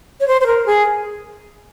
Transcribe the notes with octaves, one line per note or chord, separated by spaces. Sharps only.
C#5
C5
C5
A#4
G#4